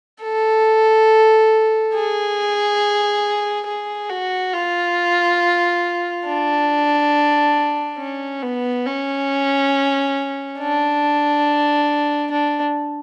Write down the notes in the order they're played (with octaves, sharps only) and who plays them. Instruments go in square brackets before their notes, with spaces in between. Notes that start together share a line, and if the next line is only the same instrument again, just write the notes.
[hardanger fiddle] A4
G#4
G#4
F#4
F4
D4
C#4
B3
C#4
D4
D4